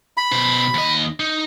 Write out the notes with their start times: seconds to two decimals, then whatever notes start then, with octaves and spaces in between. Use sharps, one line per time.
0.17 B5
0.32 B2 C5
0.75 D#2 D#5
1.20 D#4